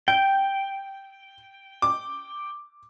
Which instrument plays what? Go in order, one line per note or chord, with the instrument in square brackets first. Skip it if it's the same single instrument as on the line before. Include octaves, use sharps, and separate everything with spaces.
[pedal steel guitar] G5 [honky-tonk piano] G6
[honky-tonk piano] D6